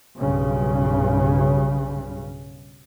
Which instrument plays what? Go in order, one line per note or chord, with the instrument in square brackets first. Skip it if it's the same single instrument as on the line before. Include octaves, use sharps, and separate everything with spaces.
[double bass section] B1 G2 C#3